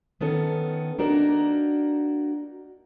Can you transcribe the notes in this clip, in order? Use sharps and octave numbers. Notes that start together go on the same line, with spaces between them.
D#3 B3 C#4 A4
A#3 D4 D#4 F#4 A#4